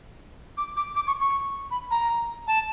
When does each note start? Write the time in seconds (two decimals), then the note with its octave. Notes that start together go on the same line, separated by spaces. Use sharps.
0.57 D6
0.77 D6
0.96 D6
1.07 C#6
1.21 C#6
1.71 B5
1.91 A#5
2.47 A5